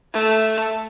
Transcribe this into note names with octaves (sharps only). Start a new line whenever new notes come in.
A3